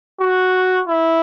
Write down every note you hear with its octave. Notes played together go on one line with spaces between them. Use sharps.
F#4
E4